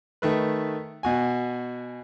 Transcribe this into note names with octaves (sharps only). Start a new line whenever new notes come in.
D#3 A3 B4
B2 F#4 G#5